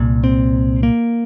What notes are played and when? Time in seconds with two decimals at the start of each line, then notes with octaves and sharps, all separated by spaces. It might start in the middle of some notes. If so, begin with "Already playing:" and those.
Already playing: C2 A#2
0.24 C4
0.83 A#3